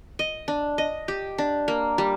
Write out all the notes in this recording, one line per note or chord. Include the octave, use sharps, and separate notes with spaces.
D#5
D4
D#5
G4
D4
A#3
G3